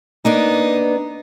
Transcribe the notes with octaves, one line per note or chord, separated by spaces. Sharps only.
A#3 B3 D4 D#4